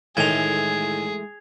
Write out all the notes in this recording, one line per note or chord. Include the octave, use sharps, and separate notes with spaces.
A2 D#3 E3 G#3 A3 G#4 G#6 F7